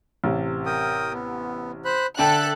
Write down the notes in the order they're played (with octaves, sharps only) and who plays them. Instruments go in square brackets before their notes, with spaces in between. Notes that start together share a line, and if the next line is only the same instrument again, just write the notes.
[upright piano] A1 C3
[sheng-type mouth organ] A#4 G5 D#6
B3
C5 B5 F#6
[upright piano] D3 G5 [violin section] A4 F#6 [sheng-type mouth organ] E5